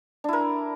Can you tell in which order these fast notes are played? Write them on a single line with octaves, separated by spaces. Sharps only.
D4 E4 A#4